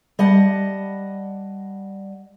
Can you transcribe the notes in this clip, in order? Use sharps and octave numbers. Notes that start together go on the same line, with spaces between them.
G3 D#5 F#5 A5